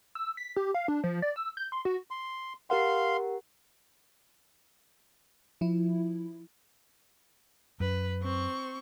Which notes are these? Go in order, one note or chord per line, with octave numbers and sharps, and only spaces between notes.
E6
B6
G4
F5
D4
F3
D5
E6
G6
C6
F#4
C6
G4 A#4 F5 F#5 C6
F3 E4
F#2 B4
C4 C#6